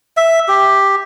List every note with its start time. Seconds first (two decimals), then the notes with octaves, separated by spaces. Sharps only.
0.17 E5
0.48 G4